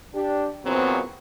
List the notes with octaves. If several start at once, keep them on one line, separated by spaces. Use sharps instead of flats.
D4 G4
E2 A#2 C#3 F#3 B3 C4